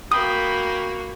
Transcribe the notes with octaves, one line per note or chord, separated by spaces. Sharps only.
A#3 F#4 G5 B5 D#6